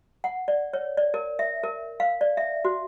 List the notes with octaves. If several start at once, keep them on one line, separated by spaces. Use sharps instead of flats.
F#5
D5
C#5
D5
A#4
E5
A#4
F5
D5
E5
F#4